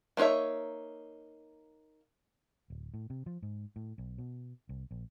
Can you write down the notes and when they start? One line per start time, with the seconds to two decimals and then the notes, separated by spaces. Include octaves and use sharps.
0.17 A#3 D#4 F#4 C#5 E5
2.70 D1
2.94 A2
3.10 C3
3.26 F3
3.42 G#2
3.76 A2
3.98 B1
4.18 B2
4.69 C2
4.91 A#1